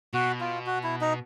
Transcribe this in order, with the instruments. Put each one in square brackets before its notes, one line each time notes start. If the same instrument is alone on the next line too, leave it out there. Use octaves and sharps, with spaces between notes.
[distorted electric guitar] B2 [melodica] F#4
[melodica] F4
F#4
E4
D#4